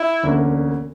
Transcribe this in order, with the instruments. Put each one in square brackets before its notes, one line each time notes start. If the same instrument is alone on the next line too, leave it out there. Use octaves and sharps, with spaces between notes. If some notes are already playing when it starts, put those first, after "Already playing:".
Already playing: [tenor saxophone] E4
[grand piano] E1 D2 D3 A#3 C#4